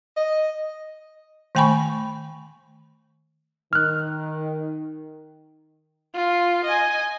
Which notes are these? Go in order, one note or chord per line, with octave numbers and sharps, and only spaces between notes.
D#5
D#3 A3 G5 G#5 B5 C#6
D#3 F6 F#6
F4
D#5 G#5